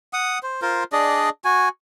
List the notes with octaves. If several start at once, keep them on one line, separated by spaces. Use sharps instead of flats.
F#5 D#6
C5
F4 A#4 C5
D4 G#4 D5 D#5
F#4 G#5